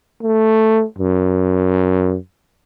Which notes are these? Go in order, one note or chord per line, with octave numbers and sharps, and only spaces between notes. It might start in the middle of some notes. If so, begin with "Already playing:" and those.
A3
F#2